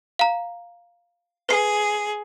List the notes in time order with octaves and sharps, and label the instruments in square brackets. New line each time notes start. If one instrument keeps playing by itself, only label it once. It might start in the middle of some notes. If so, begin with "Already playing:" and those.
[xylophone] F5 A#5
[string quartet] G#4 [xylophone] B4 C7